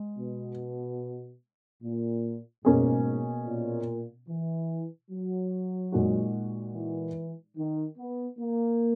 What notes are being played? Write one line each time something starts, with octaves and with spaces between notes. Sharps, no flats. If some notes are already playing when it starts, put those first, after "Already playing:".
Already playing: G#3
B2
A#2
G#2 B2 A#3 C#4 G#4
A#2
E3
F#3
A#2 G#3 D#4 F#4
E3
D#3
B3
A#3